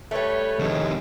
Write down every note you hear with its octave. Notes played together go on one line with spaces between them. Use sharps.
G3 A3 B4 C#5
F2 C3 D#3 G#3